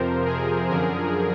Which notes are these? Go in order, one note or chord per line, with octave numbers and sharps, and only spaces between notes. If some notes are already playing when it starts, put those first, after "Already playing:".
Already playing: F2 C3 F3 A#4 C5
G#4 A#4
F#2 D3 F3 G#4 A#4